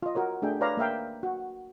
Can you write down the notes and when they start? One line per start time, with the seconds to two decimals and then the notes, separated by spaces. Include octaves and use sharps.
0.02 F4 D#5
0.15 F#4 A#4 C#5
0.42 A3 D4 G#4 E5 G5
0.61 B4 C#5 D5 F5 A#5
0.77 A#3 A#4 E5 F5 G5
1.23 F#4